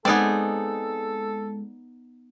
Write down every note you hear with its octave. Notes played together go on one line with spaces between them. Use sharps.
G#3 B3 C4 D#4 G#4 A4 D5